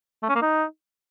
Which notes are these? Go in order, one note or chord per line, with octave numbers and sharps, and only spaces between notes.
A3
C#4
A#3
D#4